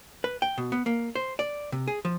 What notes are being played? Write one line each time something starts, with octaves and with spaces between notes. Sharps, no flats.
B4
G5
B2
B3
A#3
C5
D5
C3
G#4
F3